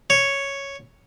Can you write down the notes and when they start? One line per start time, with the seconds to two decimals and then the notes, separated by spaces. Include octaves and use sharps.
0.10 C#5